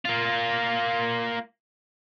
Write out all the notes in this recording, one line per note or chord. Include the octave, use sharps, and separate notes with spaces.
A#3 F4